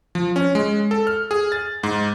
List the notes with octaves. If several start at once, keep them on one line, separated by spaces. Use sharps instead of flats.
F3
C#4
G#3
A4
F6
G#4
A6
G#2